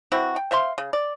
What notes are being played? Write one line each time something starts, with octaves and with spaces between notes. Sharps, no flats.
E3 C4 E4 F#4
G5
C5 E5 F5 C6
C#3
D5